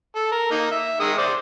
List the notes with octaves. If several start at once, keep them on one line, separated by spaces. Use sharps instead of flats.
A4
A#4
A#3 D#4
E5
D#3 G#3 D#6
C5 D5